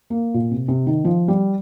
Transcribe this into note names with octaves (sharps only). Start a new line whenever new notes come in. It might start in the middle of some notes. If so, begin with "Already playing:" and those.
A#3
A#2
C3
C3
D#3
F3
G3